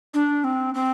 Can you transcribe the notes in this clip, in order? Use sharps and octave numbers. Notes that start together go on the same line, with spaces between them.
D4
C4
C4